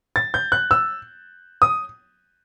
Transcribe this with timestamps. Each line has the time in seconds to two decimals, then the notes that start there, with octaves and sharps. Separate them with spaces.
0.16 A6
0.34 G6
0.52 F#6
0.71 E6
1.62 D#6